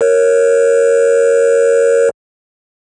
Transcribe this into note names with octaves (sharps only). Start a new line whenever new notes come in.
A#4 C#5